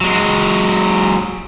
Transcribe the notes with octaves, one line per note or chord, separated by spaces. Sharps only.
F#3 G#3